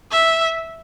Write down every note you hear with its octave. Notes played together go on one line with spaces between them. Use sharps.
E5